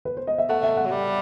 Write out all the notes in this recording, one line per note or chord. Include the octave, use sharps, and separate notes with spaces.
B4
C5
D#5
E5
A3 F#5
E5
F#5
F#3
G3